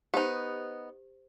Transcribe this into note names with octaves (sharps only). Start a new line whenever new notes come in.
B3 D#4 G4 C5